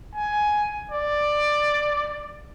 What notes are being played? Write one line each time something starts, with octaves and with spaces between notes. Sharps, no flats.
G#5
D5